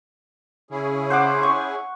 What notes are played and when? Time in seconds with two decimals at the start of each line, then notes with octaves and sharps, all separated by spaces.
0.71 C#3 C#4 E4 G#4
1.10 C5 F#5 D6
1.43 C#6